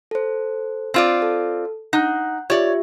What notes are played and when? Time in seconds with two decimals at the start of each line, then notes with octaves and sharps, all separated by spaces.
0.11 A4 C5
0.94 C4 F4 D5
1.22 A4
1.93 D#4 F#5 F#6
2.50 F4 G4 C#5 D5 E5